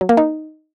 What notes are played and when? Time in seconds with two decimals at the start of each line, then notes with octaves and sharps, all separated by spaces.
0.01 F#3
0.09 A#3
0.17 D#4